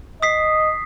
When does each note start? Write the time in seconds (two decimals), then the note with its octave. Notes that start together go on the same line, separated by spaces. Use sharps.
0.23 D#5 D#6 B6 C7